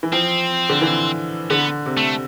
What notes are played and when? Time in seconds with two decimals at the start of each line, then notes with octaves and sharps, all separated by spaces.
0.03 E3
0.12 F3 C4
0.70 D3
0.81 E3
1.50 D3 B3
1.86 C3
1.97 A3